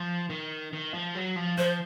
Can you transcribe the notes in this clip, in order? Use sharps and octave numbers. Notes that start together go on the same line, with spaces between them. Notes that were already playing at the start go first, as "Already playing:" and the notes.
Already playing: F3
D#3
D#3
F3
F#3
F3
F3 C5